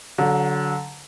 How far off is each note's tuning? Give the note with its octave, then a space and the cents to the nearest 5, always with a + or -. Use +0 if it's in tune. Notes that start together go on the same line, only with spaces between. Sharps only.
D3 -25 F#3 +0